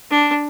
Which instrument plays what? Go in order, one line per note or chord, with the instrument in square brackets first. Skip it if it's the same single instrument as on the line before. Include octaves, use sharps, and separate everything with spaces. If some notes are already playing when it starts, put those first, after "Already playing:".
[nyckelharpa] D4